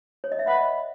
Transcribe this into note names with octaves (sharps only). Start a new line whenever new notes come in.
C#5
D#5
E5
B4 D#5 F#5